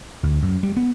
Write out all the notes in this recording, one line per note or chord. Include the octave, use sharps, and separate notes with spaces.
D2
F#2
G3
B3